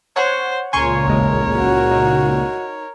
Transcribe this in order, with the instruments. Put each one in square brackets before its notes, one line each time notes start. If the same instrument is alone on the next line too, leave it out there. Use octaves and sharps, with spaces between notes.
[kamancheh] C5 [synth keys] C#5 F#5
[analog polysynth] C#2 A#2 C#3 [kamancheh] A#4 C#5 [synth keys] G#5 C6 C#6
[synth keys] A1 D#2 G#3
[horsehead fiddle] F#4
[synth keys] D#4